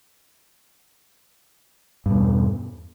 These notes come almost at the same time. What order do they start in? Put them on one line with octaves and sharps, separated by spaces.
G2 B2 E2